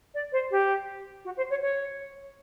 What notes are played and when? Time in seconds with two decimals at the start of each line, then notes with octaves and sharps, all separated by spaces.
0.14 D5
0.32 C5
0.51 G4
1.25 F#4
1.37 C5
1.50 C#5
1.62 C#5